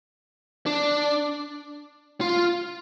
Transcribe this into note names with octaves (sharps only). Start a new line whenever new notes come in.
D4
F4